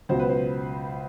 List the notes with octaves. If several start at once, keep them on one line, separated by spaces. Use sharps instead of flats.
C#2 B2 F#3 C5
B4
C5